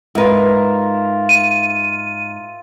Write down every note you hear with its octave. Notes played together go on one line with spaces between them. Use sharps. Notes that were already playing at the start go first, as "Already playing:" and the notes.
G#2 F4 A#4 B4 E5
D#7